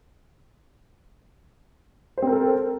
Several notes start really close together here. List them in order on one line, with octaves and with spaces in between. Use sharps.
C5 C4 A#4 A4